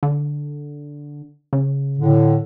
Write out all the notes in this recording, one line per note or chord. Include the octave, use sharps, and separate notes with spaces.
D3
C#3
A2 D3